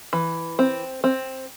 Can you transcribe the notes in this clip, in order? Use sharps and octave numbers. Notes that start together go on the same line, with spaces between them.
E3
C4
C4